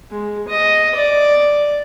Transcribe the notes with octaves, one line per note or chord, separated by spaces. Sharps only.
G#3
D#5
D5